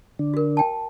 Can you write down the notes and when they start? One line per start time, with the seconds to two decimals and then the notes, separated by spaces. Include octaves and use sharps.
0.19 D3 D4
0.34 F#4 A#4
0.57 G5 A5